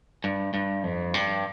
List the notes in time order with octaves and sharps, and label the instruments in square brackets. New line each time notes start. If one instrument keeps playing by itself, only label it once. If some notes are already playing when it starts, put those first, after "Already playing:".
[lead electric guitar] G2
G2
F2
G2